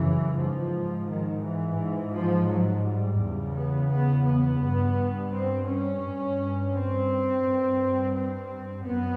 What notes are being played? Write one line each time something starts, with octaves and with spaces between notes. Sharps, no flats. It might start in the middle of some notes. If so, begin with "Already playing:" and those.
Already playing: F#2 C#3 E3
G#2 F3
D#3
E3
G#2
F3
F#3
G3
E2 C#3
B3
B3
B3
G2
C4
C#4
G2
C4
G2
C4
F#2 B3